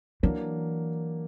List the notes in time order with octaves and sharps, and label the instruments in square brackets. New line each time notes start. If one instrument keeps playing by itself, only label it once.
[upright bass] E3 [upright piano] F#3 A#3 D4